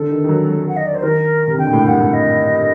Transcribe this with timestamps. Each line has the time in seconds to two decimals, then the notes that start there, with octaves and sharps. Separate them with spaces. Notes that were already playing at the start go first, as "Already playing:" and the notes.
Already playing: D3 A4
0.11 D#3
0.24 D#3
0.29 F#3
0.48 F#3
0.69 F#5
0.77 D#5
0.86 D5
0.95 C5
1.03 D#3 A#4
1.48 C3
1.58 D3 G5
1.67 A#2
1.73 A2
1.86 G2 F#5
2.00 A2
2.13 D#5